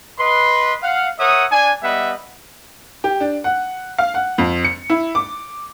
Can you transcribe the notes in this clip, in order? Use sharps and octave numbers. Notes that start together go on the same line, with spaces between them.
B4 D#5 C6
F5 F#5
A#4 C#5 E5 F#5 D#6
D4 G#5
G3 B3 B4 D#5 E5 F#5
G4
D4
F#5
F5
F#5
F2
C#7
E4
D6